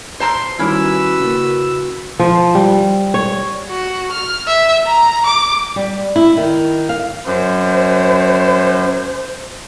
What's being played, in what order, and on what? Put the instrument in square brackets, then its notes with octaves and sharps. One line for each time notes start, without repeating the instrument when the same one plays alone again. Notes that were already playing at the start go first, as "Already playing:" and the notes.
[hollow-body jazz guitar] C5 A5 A#5 [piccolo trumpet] C6
[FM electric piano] D#3 G3 D6 [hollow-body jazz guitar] C#4 E4 [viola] F#4 B4 [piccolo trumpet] E6
[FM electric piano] C#3 A#3
[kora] F3
G3
C#5
[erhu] F#4
F6
E5
A#5
D6
[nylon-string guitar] G3
E4
D#3
F5
[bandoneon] F#2 [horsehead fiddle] C5